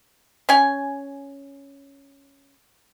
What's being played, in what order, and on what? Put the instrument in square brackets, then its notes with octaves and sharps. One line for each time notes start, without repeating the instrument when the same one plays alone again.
[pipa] C#4 G#5